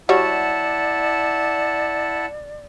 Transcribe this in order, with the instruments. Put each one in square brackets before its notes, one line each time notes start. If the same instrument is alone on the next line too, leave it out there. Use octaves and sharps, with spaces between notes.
[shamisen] G3 F#4 C#5 [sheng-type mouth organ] E4 F#5 A5 [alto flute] D5